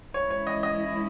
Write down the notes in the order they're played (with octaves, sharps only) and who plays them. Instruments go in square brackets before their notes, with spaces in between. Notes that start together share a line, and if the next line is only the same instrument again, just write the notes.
[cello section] E3 G#3 C#4 E4 [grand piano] C#5
[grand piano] C#5
D#5
D#5